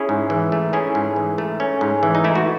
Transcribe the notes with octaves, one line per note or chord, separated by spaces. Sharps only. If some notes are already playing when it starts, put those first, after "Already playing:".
Already playing: C#4 E4 G#4
G#2
E3
A3
C#4 E4 G#4
G#2
E3
A3
C#4
G#2
E3
D#4
A3 E4
F#4